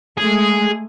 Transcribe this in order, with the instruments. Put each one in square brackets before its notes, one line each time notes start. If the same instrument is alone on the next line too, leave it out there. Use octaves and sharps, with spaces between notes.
[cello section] G#3 A3 [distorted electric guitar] G#4